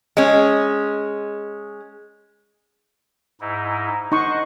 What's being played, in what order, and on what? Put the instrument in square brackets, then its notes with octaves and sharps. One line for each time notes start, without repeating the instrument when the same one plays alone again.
[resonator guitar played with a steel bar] G#3 C#4
[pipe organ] G#2 D#4 E4
[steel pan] D#4 C#6 [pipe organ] C5 D#5 F#5